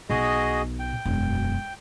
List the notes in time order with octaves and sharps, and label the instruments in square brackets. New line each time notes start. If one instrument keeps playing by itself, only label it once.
[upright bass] B1 B2 [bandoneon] F#4 G#4 D#5
[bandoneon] G5
[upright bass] E1 F#2